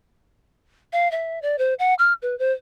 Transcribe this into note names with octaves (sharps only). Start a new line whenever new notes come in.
F5
E5
D5
C5
F#5
F6
B4
C5